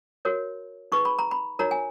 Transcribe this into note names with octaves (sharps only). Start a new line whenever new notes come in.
F#4 A#4 C#5
D#4 G#4 B4 C#6
B5
A#5
B5
D#4 F#4 A#4 C#5 A#5
G#5